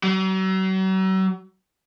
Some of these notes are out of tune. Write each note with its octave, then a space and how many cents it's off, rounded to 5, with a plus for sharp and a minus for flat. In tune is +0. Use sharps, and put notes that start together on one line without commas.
F#3 +40